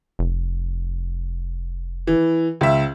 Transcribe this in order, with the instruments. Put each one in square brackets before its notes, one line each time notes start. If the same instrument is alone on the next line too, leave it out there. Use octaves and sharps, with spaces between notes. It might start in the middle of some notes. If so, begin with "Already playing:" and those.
[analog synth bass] F1
[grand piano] E3
C#2 E5